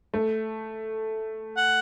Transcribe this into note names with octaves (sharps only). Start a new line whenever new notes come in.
A3
F#5